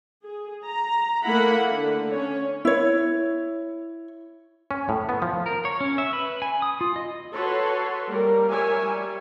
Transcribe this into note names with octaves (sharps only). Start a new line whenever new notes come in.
G#4
A#5
A3 A#3 E4 F#5 B5
D3
C#4 C#5
E4 C#5
C#4
A2
B3
F3
A#4
C#5
C#4
E5
B4
G#5
D#6
F4
D#5
F#4 A4 B4 C#5 C6
G3 A#3 A#4
A#4 C#5 E5 G#5
G3